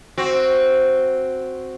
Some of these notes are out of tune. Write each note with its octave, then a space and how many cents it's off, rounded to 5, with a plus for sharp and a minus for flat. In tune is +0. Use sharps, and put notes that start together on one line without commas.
C4 +0 F#4 +0